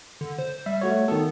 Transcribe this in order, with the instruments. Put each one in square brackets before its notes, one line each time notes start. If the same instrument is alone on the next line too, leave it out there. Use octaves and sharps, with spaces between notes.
[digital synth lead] D3
C5
[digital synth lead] G3 [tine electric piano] E5
[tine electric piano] A3 F#4 C#5
[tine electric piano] D#3 A4 [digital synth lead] B3